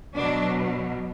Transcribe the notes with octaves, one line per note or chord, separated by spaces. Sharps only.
B2 F#3 D4